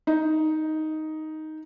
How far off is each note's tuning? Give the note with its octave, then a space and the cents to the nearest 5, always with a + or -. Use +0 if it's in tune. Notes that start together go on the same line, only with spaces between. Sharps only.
D#4 +5